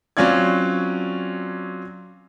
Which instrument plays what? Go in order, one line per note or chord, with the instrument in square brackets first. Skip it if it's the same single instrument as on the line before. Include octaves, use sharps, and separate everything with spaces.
[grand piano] F#3 C4 C#4 F4 D5 G#6